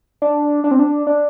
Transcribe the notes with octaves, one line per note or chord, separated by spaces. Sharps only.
D4
D4
C4
D4
D4